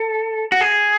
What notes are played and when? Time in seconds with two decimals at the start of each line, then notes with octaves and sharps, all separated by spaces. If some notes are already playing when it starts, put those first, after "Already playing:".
Already playing: A4
0.52 F#4
0.61 G#4